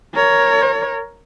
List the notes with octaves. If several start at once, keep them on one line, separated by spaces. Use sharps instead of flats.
A#4 C#5